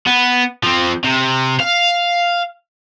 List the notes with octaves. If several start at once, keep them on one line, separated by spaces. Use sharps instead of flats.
B3
F3 C4
C3
F5